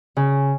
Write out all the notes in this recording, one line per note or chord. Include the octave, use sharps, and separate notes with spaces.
C#3